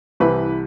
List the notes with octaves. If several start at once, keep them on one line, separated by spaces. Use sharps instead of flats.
C2 C3 E3 B4